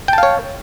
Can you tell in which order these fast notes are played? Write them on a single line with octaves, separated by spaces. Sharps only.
G5 A5 F5 C#5